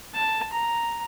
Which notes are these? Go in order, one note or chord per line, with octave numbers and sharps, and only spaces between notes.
A5
A#5